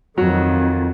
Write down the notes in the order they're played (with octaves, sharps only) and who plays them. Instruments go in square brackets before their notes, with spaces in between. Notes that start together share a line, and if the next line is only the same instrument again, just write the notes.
[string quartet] F2 D#3 [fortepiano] F#3